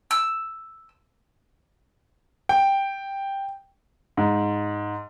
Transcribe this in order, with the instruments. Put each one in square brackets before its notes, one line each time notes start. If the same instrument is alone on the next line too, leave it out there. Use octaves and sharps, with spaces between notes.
[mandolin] E6
[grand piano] G5
[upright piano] G#2